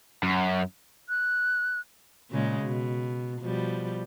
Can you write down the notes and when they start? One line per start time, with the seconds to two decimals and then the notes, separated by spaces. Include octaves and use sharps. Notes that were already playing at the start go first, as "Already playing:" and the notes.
0.23 F#2
1.09 F#6
2.31 A#2 C#3 G#3
2.62 B2
3.41 B2 F3 G3